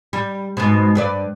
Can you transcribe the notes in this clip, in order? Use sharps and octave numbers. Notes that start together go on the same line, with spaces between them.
G3
G#2 B2
G2 B4 D5